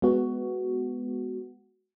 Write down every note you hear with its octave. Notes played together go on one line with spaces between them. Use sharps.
G#3 B3 F#4